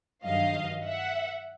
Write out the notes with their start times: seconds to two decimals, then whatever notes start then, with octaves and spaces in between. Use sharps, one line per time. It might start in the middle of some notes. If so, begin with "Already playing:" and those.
0.25 G2 D#3 F#3 D#5 F5
0.84 E5 F#5